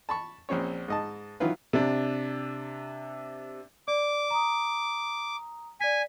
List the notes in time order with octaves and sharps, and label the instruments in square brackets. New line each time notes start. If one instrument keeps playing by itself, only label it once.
[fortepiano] A5 B5 C#6
A#1 C4 C#4 C#5
G#2 D#5 A5
D#3 E3 F#3 E4 F4 B4
[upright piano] C3 D4
[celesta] D5 [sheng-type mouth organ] D6
[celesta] A#5 D#6
[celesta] D5 B6 [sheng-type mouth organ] G#5